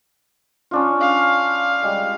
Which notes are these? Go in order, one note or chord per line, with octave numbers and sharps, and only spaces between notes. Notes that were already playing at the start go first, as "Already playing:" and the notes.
C#4 D4 F4
F5
G3 G#3